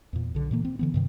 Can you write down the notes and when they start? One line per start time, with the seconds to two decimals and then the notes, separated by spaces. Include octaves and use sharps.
0.13 E2 A#2
0.35 B1 D3
0.51 A#2 E3 A#3
0.65 C4
0.79 D3 E3 B3
0.94 G2 C3 D#3